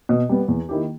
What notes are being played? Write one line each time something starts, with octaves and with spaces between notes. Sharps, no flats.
B2
G3 B3
E2
D#3 A#3 E4 G4